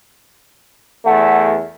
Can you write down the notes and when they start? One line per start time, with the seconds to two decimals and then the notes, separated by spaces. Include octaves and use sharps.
1.06 E2 A3 F#5